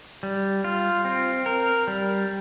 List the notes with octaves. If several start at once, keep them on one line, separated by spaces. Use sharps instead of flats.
G3
F4
C4
A#4
G3